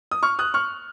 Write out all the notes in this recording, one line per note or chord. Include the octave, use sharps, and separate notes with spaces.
D#6
C#6 F6
D#6 F#6
C#6 F6